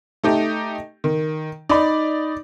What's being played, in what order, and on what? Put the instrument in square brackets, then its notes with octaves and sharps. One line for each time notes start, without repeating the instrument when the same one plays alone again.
[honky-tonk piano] A3 D#4 G4
D#3
[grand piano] D#4 B5 [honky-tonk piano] D5